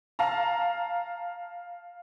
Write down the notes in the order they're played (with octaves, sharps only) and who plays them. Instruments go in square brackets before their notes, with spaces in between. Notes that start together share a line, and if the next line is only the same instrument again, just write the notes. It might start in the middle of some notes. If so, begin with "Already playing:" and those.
[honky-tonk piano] F5 A5 A#5